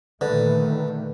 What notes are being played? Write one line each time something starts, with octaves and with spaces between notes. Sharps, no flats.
A#2 D3 D#3 A3 B4